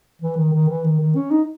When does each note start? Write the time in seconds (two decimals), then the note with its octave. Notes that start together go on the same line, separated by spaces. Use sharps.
0.22 E3
0.37 D#3
0.53 D#3
0.69 E3
0.84 D#3
1.00 D#3
1.15 C#4
1.31 D#4